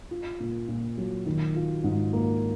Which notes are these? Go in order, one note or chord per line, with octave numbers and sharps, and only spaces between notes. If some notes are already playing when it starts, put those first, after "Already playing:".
F4
A#2
A#2
F#3
D#3
F4
G#2
A#3